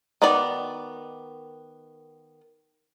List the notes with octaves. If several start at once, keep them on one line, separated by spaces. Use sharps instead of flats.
D#3 B3 D#4 F#4 D5